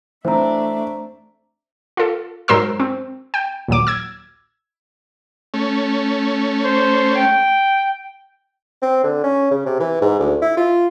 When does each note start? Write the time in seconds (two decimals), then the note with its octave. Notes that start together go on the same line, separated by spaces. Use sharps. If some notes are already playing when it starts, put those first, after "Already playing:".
0.25 E3 A3 C4 D4 C5 E5 A#5
1.97 F4 A4
2.48 G#2 F#3 A#4 C5 C6 E6
2.80 C4
3.34 G5
3.68 A#1 D#2 F#3 D6
3.87 E6 G#6
5.54 A3 C#4
6.64 C5
7.15 G5
8.82 C4
9.04 D3
9.24 C#4
9.51 C#3
9.66 C3
9.80 E3
10.01 G#2
10.19 D2
10.42 E4
10.57 F4